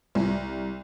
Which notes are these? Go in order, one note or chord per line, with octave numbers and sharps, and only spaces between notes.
C2